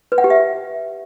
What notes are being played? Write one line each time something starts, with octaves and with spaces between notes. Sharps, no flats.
B4
F#5
G4
E5